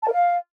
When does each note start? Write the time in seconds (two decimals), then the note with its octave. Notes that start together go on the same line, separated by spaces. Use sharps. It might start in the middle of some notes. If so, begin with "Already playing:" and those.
0.02 A5
0.07 A#4
0.12 F5